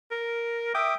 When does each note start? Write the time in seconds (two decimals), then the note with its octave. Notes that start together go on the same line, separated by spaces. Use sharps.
0.11 A#4
0.74 E5 G5 D6 D#6